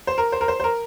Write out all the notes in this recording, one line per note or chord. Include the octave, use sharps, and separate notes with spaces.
C5
A#4
C5
A#4
C5
C5
A#4